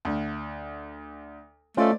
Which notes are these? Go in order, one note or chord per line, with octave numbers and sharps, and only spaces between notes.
D2
A3 C#4 F4 C5 D5 D#5